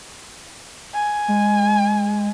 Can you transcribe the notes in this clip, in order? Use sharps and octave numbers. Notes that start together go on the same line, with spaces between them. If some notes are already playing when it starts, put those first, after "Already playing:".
G#5
G#3